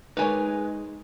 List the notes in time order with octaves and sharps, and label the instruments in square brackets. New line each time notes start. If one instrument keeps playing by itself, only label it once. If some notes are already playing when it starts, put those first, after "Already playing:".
[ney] G#3 [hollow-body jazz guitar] D#4 A#4 C#5 [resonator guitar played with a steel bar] B4 G#5